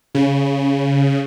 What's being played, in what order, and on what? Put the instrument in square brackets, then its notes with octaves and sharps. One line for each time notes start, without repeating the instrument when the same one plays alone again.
[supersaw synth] C#3